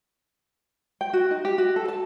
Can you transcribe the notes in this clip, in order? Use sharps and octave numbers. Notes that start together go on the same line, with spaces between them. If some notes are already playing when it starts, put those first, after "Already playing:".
G5
F#4
D#4
G4
F#4
A4
A5